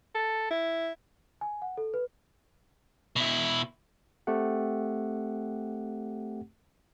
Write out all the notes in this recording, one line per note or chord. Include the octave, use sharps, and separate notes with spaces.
A4
E4
G#5
F#5
A4
B4
B2 E4
A3 C4 G4 F#5